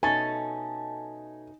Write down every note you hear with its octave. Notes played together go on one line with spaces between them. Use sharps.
B2 A3 C#4 D#4 A4 G#5